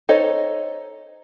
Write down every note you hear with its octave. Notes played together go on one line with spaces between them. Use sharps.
D#4 A4 C5 C#5 D#5